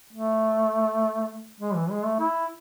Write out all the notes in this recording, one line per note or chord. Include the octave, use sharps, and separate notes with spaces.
A3
G#3
E3
G#3
A3
E4